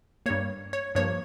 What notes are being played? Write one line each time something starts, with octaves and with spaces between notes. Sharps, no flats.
G2 G3 A#3 C#5
C#5
G2 F3 A#3 C#5